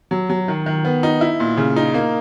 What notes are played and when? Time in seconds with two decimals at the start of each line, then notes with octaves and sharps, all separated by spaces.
0.11 F#3
0.30 F#3
0.48 D#3
0.66 D#3
0.85 B3
1.03 D#4
1.21 E4
1.40 A#2
1.57 C#3
1.76 D#4
1.94 A#3